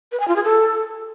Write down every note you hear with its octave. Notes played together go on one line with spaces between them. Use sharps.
B4
G#5
F4
G#4
A4